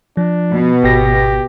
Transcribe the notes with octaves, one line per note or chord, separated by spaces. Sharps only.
F3 D4
B2
G#1 G4 A#6